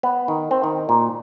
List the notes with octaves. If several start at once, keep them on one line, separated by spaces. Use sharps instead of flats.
B3
D#3
C4
D#3
A#2